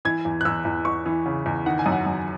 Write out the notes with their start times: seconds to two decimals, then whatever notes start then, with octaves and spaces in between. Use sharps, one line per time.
0.05 E3 G#6
0.25 E2
0.41 F#6
0.45 E2 E6
0.65 E2
0.85 E2 C#6
1.06 E3
1.26 C#3
1.46 E2
1.66 D#3 F#5
1.79 G#5
1.86 F#2
1.92 F#5
2.06 F#2